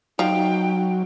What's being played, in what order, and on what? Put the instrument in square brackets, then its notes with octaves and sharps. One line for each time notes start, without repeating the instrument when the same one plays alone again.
[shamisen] F3 [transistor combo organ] F#3 [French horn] D#4 [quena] G5